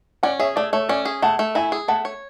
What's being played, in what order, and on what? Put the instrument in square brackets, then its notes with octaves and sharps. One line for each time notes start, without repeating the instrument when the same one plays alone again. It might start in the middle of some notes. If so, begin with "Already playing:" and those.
[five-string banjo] C#4 [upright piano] D5 F#5
[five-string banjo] G#4 [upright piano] C#5 E5
[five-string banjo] A3 [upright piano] D5
[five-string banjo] A3 [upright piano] C#5
[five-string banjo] C#4 [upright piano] D5
[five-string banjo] G#4
[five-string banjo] A3 [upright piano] F#5 A5
[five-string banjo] A3
[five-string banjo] E4 [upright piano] E5 G#5
[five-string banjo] G#4
[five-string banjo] A3 [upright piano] F#5 A5
[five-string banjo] C#5